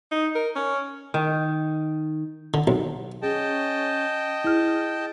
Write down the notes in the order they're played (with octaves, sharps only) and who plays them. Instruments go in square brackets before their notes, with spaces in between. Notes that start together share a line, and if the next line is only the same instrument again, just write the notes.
[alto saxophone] D#4
A#4
C#4
[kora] D#3
[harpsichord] D3
B1
[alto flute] C#4 [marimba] G#4 [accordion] D#5 G5 A5
[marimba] E4 F6 [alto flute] G#4